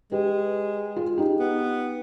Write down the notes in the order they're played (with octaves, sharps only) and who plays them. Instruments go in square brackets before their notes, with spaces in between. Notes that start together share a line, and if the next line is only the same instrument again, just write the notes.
[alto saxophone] G#3 [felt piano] G4 B4
[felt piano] F4 G#4
D#4 G4
[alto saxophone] B3